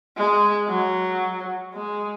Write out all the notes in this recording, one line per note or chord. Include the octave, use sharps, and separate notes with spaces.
G#3
F#3
G#3